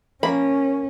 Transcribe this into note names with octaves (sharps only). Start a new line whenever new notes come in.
F3 A#3 C#4 B5